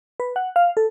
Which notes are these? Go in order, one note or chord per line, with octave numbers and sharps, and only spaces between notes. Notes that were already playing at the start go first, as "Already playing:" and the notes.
B4
F#5
F5
A4